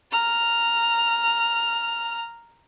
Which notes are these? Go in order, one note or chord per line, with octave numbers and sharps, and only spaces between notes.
A#5 F6